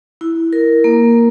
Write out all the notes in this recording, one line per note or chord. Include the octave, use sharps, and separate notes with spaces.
E4
A#4
A#3